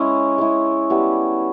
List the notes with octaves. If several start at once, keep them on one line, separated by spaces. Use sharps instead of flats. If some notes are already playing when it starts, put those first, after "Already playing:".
Already playing: G#3 C#4 E4
G#3 C#4 E4
G3 B3 E4